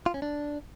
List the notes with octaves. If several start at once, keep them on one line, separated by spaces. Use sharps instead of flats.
F4
C#4
D4